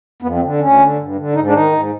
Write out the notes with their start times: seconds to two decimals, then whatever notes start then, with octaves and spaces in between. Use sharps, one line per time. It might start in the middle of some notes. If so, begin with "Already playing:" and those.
0.22 F2 B3
0.35 C4
0.41 D3
0.60 D2 C#4
0.78 D3
0.98 G2
1.15 D3
1.34 G#2 D#4
1.46 D4
1.53 D#3 D#4
1.72 G#2